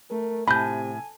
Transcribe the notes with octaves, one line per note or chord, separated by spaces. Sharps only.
A3 A#4
A2 C3 G#5 B5 G6